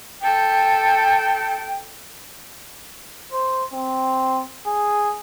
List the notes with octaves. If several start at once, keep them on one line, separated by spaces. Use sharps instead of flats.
A4 G5
C5
C4
G#4